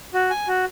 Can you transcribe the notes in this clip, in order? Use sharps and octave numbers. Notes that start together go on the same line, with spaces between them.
F#4
G#5
F#4